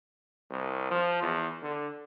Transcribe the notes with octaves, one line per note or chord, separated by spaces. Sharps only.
C2
F3
E2
D3